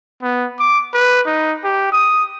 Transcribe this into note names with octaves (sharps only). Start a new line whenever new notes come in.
B3
D6
B4
D#4
G4
D#6